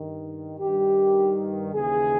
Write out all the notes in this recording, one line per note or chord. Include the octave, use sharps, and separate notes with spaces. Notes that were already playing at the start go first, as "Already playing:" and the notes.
Already playing: G2 D#3
G2 D#3 G4
D#2 C#3 E3 G#4